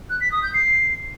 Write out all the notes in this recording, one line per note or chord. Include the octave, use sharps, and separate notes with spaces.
F#6
B6
D#6
G6
C7